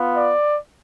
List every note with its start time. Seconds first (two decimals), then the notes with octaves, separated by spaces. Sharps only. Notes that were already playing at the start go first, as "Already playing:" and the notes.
Already playing: B3 F4
0.15 D5